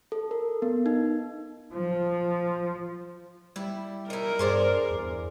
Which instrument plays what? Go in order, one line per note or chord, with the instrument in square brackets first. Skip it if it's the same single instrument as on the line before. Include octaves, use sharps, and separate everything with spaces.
[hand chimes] A4
A#4
B3
D#4
[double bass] F3
[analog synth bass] G3 [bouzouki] E4
[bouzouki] D#4 E4 [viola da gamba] A#4
[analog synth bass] G2 [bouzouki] G#4 C5 D5
[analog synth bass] E2